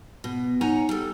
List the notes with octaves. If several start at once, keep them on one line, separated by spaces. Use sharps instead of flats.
B2
D#4 C#5 F#5 G#5 A#5
G3 A4